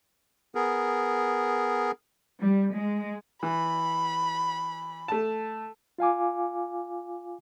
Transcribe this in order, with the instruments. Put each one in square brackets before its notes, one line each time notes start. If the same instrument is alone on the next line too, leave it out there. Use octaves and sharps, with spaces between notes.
[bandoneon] B3 G#4 A#4
[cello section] G3
G#3
[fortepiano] E3 [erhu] B5
[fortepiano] A3 A5
[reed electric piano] F4 F5 G#5 D6